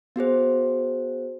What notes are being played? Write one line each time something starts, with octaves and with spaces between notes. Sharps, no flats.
B3 F#4 G#4 C5